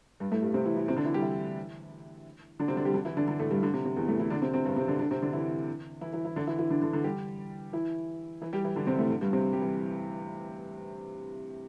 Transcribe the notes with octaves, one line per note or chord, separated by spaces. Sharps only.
G2 G3
A2 A3
G2 G3
C3 C4
E3 E4
E3 E4
C3 C4
D3 D4
E3 E4
G3 G4
E3 E4
D3 D4
C3 C4
D3 D4
G3 G4
D3 D4
E3 E4
D3 D4
D3 D4
A2 A3
G2 G3
D3
C3
C3
E2 E3
A2 A3
E3 E4
D3 D4
C3 C4
C3 C4
G2 G3
C3 C4
D3 D4
D3 D4
C3 C4
D3 D4
E3 E4
E3 E4
E3 E4
E3 E4
D3 D4
E3 E4
E3 E4
D3 D4
D3 D4
D3 D4
G3 G4
E3 E4
E3 E4
G3 G4
E3 E4
D3 D4
C3 C4
A2 A3
D3
G2 G3
C3 C4
G3 G4
E3 E4